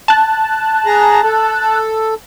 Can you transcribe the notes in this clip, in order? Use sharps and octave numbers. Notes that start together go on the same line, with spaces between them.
A5 F#6
G#4 A#5
A4